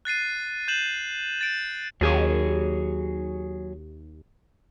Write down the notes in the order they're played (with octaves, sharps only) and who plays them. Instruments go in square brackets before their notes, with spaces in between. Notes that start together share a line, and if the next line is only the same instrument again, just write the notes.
[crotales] F#6 A6 C7 D#7
G6 E7 F#7
A6 D7
[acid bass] D#2 [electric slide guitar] F#3 G#4 C#5